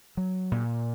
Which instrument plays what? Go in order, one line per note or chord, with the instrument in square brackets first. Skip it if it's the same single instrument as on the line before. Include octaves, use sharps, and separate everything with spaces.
[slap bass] F#3
A#2